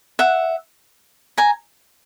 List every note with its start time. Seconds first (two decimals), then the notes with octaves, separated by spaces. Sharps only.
0.19 E5 F#5
1.38 G#5 A#5